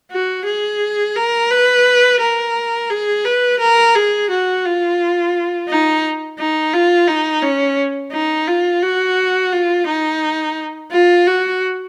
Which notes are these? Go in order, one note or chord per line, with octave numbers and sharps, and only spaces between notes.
F#4
G#4
A#4
B4
A#4
G#4
B4
A#4
G#4
F#4
F4
D#4
D#4
F4
D#4
C#4
D#4
F4
F#4
F4
D#4
F4
F#4